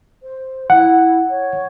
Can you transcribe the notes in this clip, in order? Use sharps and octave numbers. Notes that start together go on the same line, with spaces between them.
C5
E4 F#5
C#5